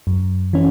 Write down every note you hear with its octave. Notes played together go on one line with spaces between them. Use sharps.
F#2
E3 C#4